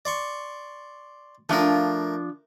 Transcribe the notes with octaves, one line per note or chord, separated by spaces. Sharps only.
D5 C6 C#6
F3 A3 D4 F4 A#4